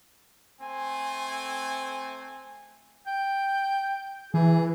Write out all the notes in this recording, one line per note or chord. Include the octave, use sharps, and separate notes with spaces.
A3 C4 G#5
G5
E3 G#4